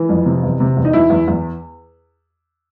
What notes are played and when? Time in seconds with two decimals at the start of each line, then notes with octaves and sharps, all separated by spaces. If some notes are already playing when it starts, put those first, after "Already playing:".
Already playing: E3
0.09 F2
0.25 C3
0.43 E2
0.60 C3
0.77 E2
0.85 D#4
0.93 E2 E4
1.10 E2
1.28 E2